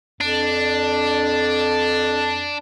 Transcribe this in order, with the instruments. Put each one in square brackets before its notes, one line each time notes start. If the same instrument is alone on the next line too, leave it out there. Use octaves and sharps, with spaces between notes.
[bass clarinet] F2 [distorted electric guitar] D4